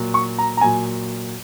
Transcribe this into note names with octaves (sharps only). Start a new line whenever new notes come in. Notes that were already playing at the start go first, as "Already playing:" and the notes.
Already playing: A#2 F#3
C#6
A#5
A#5
A#2 F#3 G#5